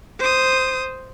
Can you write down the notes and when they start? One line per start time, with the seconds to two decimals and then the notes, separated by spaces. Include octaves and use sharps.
0.19 C5 D#6